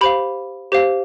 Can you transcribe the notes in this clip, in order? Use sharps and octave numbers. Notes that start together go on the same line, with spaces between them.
G4 C5 F5 B5
G4 C5 F5